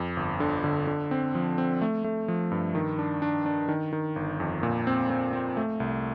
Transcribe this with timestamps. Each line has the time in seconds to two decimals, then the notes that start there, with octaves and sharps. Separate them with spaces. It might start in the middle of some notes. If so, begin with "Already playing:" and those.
Already playing: F2
0.17 G1
0.40 D3
0.64 D3
0.87 D3
1.11 C4
1.35 F3
1.58 C4
1.81 A3
2.04 A3
2.28 F3
2.51 G2
2.75 D#3
2.99 D4
3.22 D4
3.46 D4
3.68 D#3
3.93 D#3
4.16 G1
4.40 F2
4.63 A#2
4.87 C4
5.10 C4
5.33 C4
5.57 A3
5.80 C2